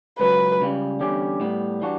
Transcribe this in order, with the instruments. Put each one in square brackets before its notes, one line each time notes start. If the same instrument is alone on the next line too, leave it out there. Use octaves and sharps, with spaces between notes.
[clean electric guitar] C#2 C#3 F#3 [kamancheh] B4
[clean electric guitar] C#2 C#3 G3
E2 D3 G3 C#4 G4
A2 G3 B3
E3 G3 D4 F#4